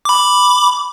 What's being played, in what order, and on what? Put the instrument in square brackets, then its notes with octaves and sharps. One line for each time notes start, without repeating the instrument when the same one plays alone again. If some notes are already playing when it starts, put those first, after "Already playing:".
[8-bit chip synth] B5 D6